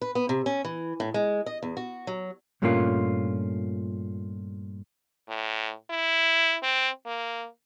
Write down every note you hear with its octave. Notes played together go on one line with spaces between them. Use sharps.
B4
B3
C3
C#4
E3
A2
G#3
D#5
E2
F#4
F#3
G2 A#2 A3 A#3 C#4 F4
A2
E4
C4
A#3